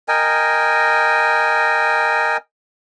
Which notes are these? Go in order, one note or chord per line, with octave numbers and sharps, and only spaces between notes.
A#4 D#5 G5 G#5